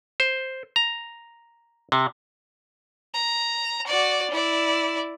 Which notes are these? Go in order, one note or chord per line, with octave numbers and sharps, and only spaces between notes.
C5
A#5
C3
A#5
F#4 D5
E4 D5